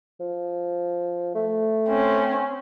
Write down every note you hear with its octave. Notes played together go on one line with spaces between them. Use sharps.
F3
A3
C4 C#4